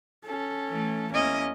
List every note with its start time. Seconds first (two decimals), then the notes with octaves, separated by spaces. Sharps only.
0.25 C#4 A4
0.68 E3 A3
1.11 E2 E3 A#3 C#4 D#5